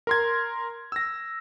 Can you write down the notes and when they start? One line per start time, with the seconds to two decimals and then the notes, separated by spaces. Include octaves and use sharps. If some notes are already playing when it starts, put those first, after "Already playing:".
0.07 A#4 C6 G#6
0.92 E6 A#6